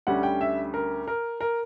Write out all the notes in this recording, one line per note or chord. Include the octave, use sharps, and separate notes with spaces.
D2 D3 G3 C#4 F#5
G5
E5
A#4
A#4
A#4